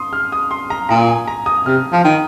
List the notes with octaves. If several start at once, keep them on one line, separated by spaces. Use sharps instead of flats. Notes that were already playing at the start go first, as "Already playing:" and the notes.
Already playing: C6 D#6
F6
D#6
C6
A#5
A#2 A#5
G#5
A#5
D#6
C3 F6
F3
D#3